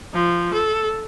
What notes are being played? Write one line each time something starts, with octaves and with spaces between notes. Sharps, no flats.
F3
A4